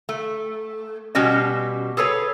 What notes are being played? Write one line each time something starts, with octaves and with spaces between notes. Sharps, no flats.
A3
B2 G3 C#4 F#4 D#5
G#4 A4 B4 C#5